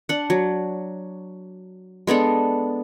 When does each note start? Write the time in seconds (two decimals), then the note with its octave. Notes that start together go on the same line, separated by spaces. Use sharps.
0.09 D4 F#5
0.30 F#3
2.07 G#3 B3 D4 A4